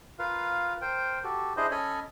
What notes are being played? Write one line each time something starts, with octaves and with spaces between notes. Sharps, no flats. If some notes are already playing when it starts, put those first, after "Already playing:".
F4 A#4 B4 F5
A#4 C5 G5
F#4 G4 A4
D4 E4 G#4 C5 D#5
C#4 A4 C#5 D#5 G#5 B5